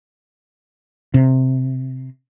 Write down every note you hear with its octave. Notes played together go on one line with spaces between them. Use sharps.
C3